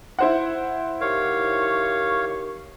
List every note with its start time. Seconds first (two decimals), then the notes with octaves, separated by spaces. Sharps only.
0.19 E4 C5 F#5
1.01 D#3 G4 C#5 F5 C#6